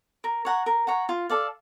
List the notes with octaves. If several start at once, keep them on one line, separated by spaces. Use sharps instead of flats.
A#4
C#5 F#5 A#5
A#4
C#5 F#5 A#5
F4
A4 D5 F5